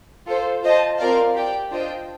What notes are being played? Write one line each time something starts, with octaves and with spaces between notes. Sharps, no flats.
F4 A4 C5
F4 C5 D#5 A5
C4 F4 A#4 D5 F5
G4 D5 G5
D4 F4 C5 D#5 G5